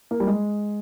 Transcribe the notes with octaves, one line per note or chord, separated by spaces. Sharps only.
A#3
G3
G#3